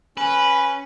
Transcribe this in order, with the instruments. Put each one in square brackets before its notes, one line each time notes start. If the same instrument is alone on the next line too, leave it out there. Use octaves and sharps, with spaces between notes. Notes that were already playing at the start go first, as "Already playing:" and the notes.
[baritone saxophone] C#4 [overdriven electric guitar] B4